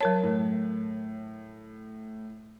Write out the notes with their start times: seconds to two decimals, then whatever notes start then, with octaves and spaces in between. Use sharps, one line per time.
0.01 F#3 A#4 C#5 A5
0.23 A2